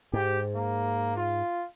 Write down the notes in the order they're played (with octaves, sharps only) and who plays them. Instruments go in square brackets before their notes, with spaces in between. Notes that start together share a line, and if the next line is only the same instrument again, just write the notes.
[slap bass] G#2 [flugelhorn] G4
[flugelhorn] A#3
F4